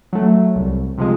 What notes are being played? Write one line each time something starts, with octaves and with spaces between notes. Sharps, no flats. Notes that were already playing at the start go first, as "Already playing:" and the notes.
F#3 A3
C2
C3 F3 G#3